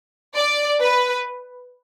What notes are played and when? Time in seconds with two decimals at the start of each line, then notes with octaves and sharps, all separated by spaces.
0.36 D5
0.81 B4